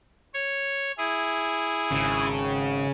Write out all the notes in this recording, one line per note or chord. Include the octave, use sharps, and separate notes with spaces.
C#5
E4 G#4
G#1 C#3